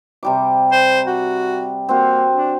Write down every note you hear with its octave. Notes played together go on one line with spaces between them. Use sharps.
C3 G3 D6
C5
F#4
A#3 C4 F#4
D4